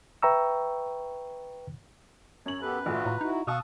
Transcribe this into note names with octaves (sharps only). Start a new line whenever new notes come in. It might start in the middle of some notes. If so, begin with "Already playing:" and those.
B4 E5 G5 A#5 C#6 E6
F#2 C#5 F#7
B3 G4 A4 B4
A#1 A2 F4 F#4
A2 A#5
D#4 E4 F#4
B2 F5 F#5 A5 C#6 D#6 E6